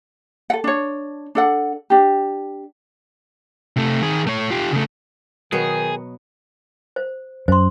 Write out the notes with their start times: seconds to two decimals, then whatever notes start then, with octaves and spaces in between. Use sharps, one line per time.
0.50 A4 F#5
0.64 D4 C#5
1.35 D4 A4 F#5
1.90 D4 G4
3.76 C3 A3
4.02 D#3 G#4
4.27 A3 C#5
4.51 F4 G4
4.71 C#3 A3
5.52 B2 D#3 F#3 B3 G#4
6.96 C5
7.48 F#2 C5 C6